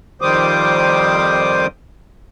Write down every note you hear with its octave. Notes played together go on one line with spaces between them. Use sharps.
F2 D#3 G3 C5 D6 D#6